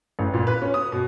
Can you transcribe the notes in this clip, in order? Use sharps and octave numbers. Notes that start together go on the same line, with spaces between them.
A1
A#2
B4
C#4
D#6
B2